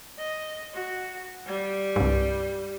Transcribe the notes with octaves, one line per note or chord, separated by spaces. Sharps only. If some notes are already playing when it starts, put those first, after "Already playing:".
D#5
F#4
G3
C2 G2